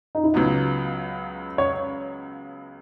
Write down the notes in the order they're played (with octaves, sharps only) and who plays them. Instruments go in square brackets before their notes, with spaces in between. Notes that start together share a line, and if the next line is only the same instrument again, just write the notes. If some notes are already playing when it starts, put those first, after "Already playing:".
[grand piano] D#4
E4
[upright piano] C#2 C#3 F#3 B3 [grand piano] F4
[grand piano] C#5